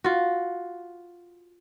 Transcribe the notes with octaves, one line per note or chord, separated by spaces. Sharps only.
F4 F#4